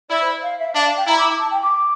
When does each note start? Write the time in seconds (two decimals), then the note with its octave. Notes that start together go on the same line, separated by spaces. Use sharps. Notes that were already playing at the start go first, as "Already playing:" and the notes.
0.09 E4 D5
0.21 C5
0.43 F5
0.59 E5
0.74 D4 F5
0.81 E5
0.85 F5
0.97 G5
1.07 E4 A#5
1.18 D6
1.40 A5
1.51 G5
1.62 D6